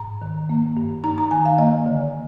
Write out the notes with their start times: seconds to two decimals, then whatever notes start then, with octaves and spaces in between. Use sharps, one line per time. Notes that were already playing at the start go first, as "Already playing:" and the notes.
Already playing: G#2 A#5
0.22 D#3
0.49 A#3
0.77 G2
1.04 D#4 A#5
1.18 A#5
1.31 D#3 G#5
1.45 F5
1.58 A#3 D#5
1.86 D3